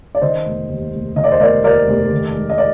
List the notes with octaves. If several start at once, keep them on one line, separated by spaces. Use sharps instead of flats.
D5
D#3 C5 D#5
F1
D#2
F1
D#3 D#5
D5
C5 D#5
F1 A#4 D5
D#2 A#4 D5
F1
D#3
G#3
D#5
D5